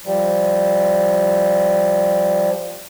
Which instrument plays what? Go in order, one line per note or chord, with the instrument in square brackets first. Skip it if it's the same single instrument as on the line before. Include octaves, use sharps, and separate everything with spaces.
[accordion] F3 G3